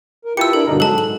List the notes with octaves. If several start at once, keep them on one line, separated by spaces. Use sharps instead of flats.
A#4
E4 F4 G4 B4 A5 E6 C#7
D4 E4 A4 A#4
G2 B2 D3 D4 D#4 A#4
G#2 F#3 G#3 A4 A5 F#6
F#7